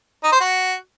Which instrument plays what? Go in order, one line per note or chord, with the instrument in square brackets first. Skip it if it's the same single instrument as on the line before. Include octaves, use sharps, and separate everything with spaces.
[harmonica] D#4
C5
F#4